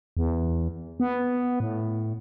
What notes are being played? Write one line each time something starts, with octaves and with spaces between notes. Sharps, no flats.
E2
B3
A2